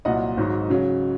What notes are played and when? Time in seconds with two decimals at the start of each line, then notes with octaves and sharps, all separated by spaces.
0.05 C2 A#2 F#3 D#5 F#5
0.37 G#1 G#2 F#3
0.70 C#3 F#3